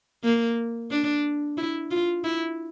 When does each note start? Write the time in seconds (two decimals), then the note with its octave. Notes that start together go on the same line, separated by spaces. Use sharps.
0.24 A#3
0.91 D4
1.57 E4
1.91 F4
2.24 E4